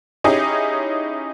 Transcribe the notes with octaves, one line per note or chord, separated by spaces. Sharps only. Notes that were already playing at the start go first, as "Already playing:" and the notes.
C#4 D#4 E4 G4 G#4